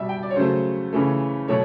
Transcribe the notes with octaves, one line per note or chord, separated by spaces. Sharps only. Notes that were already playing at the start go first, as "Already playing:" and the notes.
Already playing: B2 G3 E5
G5
D5
C#5
C#3 F#3 A3 C5
C#3 E3 A3
B2 F#3 A3 C#5